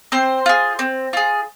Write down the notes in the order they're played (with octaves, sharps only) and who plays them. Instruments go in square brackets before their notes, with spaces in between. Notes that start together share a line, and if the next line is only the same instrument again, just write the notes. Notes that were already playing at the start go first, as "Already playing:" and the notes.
[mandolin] C4 C5
F4 G#4
C4
F4 G#4